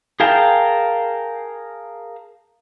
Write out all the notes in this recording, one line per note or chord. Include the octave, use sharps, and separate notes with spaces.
G#4 A#4 F5 G5 A5